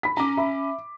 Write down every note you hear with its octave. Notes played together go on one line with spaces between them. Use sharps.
B5 B6
C#4 A#5 D6
E5 B5